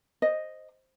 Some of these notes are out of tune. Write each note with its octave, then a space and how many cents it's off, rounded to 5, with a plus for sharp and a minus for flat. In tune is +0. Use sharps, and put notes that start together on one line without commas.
C5 +0 D#5 +0